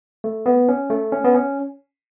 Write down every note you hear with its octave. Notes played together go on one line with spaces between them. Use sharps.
A3
B3
C#4
A3
C#4
B3
C#4